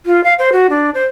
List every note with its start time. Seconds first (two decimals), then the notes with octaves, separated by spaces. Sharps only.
0.06 F4
0.24 F5
0.39 C5
0.52 F#4
0.70 D4
0.94 C5